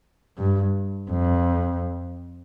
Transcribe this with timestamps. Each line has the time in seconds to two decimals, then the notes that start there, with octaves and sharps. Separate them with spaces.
0.38 G2
1.11 F2